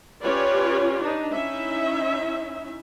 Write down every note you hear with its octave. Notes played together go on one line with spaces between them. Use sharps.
C#4 F4 G4 B4 C#5 D5
D4 D#4
C#4 D#4 E4 E5